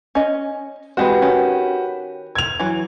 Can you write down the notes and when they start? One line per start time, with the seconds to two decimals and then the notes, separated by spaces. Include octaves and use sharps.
0.15 C#4 D#5
0.97 E3 G#3 C4 F#4 G4 B4
1.22 D#3 C#4
2.35 G#6 F7
2.60 E3 F#3